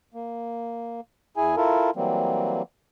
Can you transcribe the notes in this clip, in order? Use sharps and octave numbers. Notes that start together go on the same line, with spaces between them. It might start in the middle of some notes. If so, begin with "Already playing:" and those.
A#3
E2 E4 G#4 G#5
E4 F4 A4 A#4
E3 F#3 G3 A#3 C4